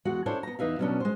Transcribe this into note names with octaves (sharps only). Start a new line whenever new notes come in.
E2 G#3 F#4 F#5
C#4 D4 E4 A4 C5 C#5
B3 A#5
E2 D#4 B4 E5 F5
B2 F#3 A#3 B3 C#4 D4
G#3 C5